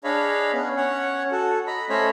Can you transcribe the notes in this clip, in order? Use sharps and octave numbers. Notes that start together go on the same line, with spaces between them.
D4 G#4 C#5 D#5 F5 B5
B3 C#4
C#4 C#5 F#5
F#4 A4
D#5 A#5 B5
A3 C#4 C5 C#5 D#5 B5